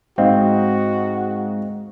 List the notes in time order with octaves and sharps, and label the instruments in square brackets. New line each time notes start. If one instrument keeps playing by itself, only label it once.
[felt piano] G#2 D#5 F5 [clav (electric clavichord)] C4 [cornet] F#4